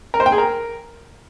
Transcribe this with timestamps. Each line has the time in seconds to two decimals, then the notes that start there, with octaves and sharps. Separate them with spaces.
0.14 A#4
0.20 C5
0.26 G5
0.32 G#4
0.38 A#4